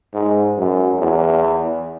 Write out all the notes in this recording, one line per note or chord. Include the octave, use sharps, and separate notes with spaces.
G#2
F#2
E2